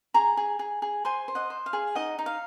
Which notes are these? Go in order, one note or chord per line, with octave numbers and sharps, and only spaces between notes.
G#4 A#5 C#6
G#4
G#4
G#4
C5 G#5 C6
C5
D#5 F#5
C5
F5
G#4
D#4 D#5 F#5
D#4
F5